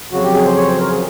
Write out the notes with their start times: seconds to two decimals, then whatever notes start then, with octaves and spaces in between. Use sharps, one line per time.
0.12 F2 C#3 F#3 F#4
0.24 G4
0.35 G#4
0.45 C5
0.56 C#5
0.68 C5
0.79 A#4
0.90 G#4